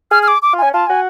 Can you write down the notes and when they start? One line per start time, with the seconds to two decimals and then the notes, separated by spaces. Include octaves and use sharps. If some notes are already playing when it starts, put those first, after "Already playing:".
0.11 G#4 F6
0.23 F6
0.28 D6
0.42 D6
0.53 F4
0.58 C#4 G#5
0.73 F4 A5
0.87 F#4 G#5